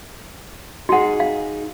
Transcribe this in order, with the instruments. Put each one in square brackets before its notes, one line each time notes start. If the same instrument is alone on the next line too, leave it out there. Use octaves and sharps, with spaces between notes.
[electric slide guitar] D#4 G#4 [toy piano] F#4 F#5
[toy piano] F5